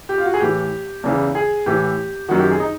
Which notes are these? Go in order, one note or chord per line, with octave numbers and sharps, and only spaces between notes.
G4
F4
F#4
G#4
A2 E3 G4
E2 C#3 E3
G#4
A2 E3 G4
F#2 D#3 F#4
G4
G#4
D#4